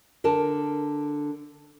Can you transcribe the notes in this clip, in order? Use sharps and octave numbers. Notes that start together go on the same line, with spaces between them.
D3 A#4 A5